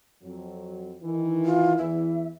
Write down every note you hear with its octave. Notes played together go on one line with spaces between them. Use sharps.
F2 F#3
D#3 E3
F4
E2 E3 E5